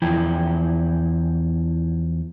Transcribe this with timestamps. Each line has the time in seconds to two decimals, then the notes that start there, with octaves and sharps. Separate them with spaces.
0.02 E2 F3 E4 G5